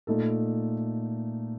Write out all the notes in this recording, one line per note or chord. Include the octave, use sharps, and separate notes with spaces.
A#2 A3 D#4 A4